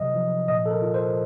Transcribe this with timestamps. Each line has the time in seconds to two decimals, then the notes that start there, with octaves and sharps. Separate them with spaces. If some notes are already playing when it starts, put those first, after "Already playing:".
Already playing: C3 F#3 D#5
0.14 F3
0.48 A#2 D#5
0.66 A4
0.70 A#4
0.82 F4
0.94 C5